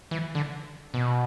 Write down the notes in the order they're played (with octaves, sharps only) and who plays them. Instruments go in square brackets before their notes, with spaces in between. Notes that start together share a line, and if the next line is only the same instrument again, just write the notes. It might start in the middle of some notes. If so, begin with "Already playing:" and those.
[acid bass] E3
D3
B2